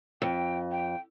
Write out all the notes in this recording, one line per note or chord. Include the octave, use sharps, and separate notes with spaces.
F2 G5
G5